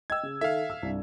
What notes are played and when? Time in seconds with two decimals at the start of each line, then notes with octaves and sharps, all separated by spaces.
0.10 D#5 G5 E6 G#6
0.23 C#3
0.41 D#3 A4 E5 F5
0.70 E6
0.83 C2 G2